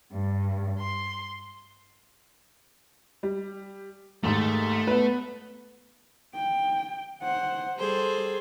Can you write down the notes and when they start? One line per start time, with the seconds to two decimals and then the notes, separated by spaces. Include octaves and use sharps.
0.12 G2
0.78 C6
3.23 G3
4.24 D#2 G#2 A3
4.87 B3 B4
6.35 G5
7.23 C5 F#5
7.78 G3 G#4 A4 C5